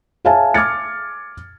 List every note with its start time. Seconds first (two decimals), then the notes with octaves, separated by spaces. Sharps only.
0.25 G#4 C#5 E5 F5 G#5 A5
0.54 D6 F6 G#6 A6 C#7